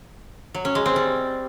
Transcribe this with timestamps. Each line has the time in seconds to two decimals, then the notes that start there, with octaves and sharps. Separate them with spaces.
0.54 F#3
0.65 C#4
0.75 G#3
0.86 C4
0.96 G3